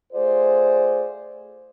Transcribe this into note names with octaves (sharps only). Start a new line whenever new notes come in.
A3 F4 G#4 C5 D5